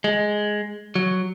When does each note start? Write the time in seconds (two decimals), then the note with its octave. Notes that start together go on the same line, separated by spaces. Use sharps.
0.04 G#3
0.95 F#3